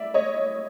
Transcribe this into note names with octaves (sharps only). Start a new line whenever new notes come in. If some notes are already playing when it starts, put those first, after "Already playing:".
Already playing: D5 E5
C#5 D#5